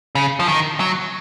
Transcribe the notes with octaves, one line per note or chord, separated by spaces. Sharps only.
C#3
F3
D#3
F#3